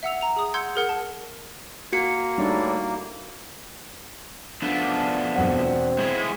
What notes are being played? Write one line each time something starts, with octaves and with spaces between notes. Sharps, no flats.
E5 F#5 E6 F7
A#5 F7
G#4 D#6
F#5 C6 E6 G6 G#6 C#7
G#4 A#4 F#5
A5
A#3 F#4 C#7
A2 G3 D4 D#4 D5
F3 A3 B3 D4
E1 C4 F#5
G#3 E4 G#4 C#5